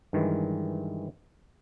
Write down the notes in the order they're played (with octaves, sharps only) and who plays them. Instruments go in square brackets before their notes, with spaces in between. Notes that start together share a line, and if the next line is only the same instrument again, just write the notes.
[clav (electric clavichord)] G2 D#3 E3 G#3